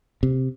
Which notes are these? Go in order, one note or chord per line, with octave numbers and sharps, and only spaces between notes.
C3